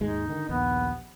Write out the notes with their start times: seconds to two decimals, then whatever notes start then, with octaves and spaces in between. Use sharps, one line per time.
0.01 D#2 G#2 G#3 D#4
0.28 D3 D#3
0.49 A#1 D#2 B3